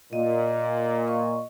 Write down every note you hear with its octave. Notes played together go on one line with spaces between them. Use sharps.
A#2 D#5
D#5 C#6